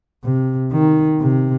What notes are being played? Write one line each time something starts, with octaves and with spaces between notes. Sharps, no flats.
C3
D#3
C3